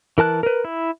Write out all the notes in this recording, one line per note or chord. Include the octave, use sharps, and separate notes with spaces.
E3 A#4 A5 F#6
A#4 B4
E4